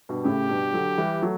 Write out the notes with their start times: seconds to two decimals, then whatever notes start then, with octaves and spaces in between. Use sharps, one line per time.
0.09 G2 B2
0.25 A2 C#3 G4
0.49 G2 B2
0.74 D3 F#3
0.98 E3 G3
1.22 F#3 A3